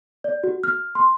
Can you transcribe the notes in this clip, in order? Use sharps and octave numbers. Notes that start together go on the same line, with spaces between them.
D5
F#4
F6
C6